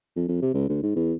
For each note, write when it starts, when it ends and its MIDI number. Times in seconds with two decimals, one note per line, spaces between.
0.16 0.25 41
0.28 0.40 41
0.42 0.49 48
0.54 0.66 37
0.69 0.82 38
0.83 0.92 44
0.96 1.13 40